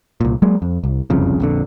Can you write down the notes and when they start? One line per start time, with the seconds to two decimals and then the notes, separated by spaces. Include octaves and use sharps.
0.21 C2 A#2
0.42 F#3 G#3 A#3
0.62 F2
0.84 C2
1.10 F#1 C2 F2 C#3
1.40 A#1 F2 D3